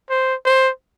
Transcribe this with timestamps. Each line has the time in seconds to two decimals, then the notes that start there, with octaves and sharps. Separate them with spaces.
0.10 C5
0.45 C5